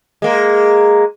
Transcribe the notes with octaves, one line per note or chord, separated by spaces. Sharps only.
G#3 A#3